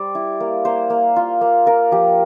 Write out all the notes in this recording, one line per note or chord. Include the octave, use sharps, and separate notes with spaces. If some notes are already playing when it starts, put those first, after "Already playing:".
Already playing: G3 C5 D5
E4
A#3
A#3 C5
A#3
F4
A#3
F4 A#4
F3 G4